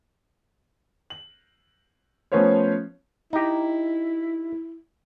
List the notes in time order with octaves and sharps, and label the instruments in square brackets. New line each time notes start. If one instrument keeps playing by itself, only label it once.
[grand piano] F#7
F3 A3 B3 C#4 C5 C#5
[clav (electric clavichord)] D#4 G4 [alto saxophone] E4